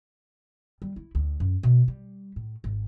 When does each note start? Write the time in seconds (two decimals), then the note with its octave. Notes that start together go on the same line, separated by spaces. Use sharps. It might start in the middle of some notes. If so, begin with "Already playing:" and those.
0.82 G3
0.96 E4
1.15 D2
1.40 F#2
1.63 B2
1.88 G3
2.36 A2
2.64 G#1